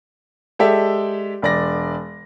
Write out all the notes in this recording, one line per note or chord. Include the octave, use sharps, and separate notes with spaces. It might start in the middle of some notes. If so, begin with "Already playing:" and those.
G#3 G4 A4 D5 E5
E1 D5 A#6